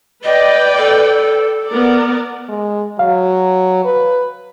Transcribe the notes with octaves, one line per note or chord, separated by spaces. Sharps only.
B4 D5 D#5 G5
A4
B3 A#4 D5
G#3
F#3 F5
B4